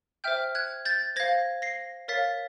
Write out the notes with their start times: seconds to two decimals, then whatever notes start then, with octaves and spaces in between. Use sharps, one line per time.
0.24 C5 E5 G5 F6 G6
0.55 F#6 G#6
0.85 G6 A6
1.16 C5 F5 G#6 A#6
1.62 A#6 C7
2.08 A#4 C#5 F5 A6 B6